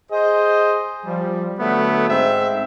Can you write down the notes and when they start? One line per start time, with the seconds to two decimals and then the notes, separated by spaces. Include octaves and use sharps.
0.11 G#4 C5 D#5
1.05 F3 G3
1.59 D3 F#3 A3 B3
2.08 G#2 C4 E5